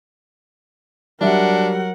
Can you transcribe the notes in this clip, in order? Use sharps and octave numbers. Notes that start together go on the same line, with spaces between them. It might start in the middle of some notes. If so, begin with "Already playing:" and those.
F#3 G3 D4 A#4 E5 F#5